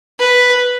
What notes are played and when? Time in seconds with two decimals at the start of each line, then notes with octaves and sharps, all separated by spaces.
0.19 B4